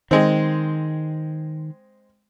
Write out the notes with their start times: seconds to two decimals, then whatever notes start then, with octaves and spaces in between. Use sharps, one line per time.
0.11 D#3 G#3 C4